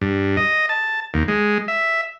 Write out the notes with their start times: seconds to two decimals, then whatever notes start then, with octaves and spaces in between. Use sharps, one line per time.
0.01 G2
0.37 D#5
0.69 A5
1.14 D#2
1.28 G#3
1.68 E5